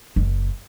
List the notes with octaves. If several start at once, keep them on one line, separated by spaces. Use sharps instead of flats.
F#1